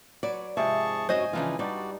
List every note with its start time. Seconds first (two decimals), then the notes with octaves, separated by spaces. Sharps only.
0.23 F#3 B4 C#5 D5
0.57 G#2 C3 F3 G#4 E5 A5 C#6
1.09 F#2 F#3 F#4 C5 D#5 G#5
1.33 C#3 E3 F3 D4 D#4 F4
1.59 G2 G3 D4 D#4 F#4 D5